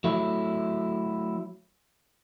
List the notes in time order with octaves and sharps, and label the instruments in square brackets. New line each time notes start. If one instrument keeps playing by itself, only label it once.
[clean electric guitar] F#3 A3 E4